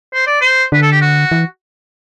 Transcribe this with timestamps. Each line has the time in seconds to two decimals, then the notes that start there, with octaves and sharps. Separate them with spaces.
0.14 C5
0.27 D5
0.41 C5
0.72 D3 B4
0.82 A4
0.92 G4
1.01 F#4
1.31 E3